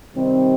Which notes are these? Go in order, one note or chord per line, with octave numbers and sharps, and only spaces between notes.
C3 D#3 G3 C4 D#4